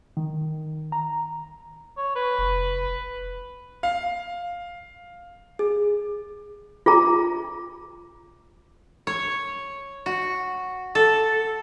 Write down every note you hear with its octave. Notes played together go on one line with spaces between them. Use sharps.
D#3
A#5
C#5
B4
F1
F5
G#4
F4 G#4 A#5
C#5
F#4
A4